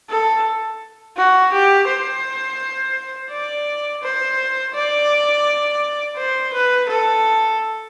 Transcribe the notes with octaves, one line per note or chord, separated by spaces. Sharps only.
A4
F#4
G4
C5
D5
C5
D5
C5
B4
A4